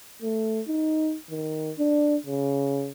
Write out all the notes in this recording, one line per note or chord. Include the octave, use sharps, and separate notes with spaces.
A3
D#4
D#3
D4
C#3